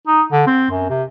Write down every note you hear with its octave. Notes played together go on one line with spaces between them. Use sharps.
D#4
D3
C4
F#2
C3